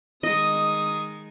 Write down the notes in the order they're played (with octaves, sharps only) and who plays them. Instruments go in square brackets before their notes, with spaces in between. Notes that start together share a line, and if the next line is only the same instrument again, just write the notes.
[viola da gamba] D#3 G#3 [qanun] D#5 [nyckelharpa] D#6